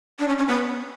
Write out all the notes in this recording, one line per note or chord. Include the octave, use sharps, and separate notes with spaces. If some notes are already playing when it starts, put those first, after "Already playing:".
D4
C#4
C#4
B3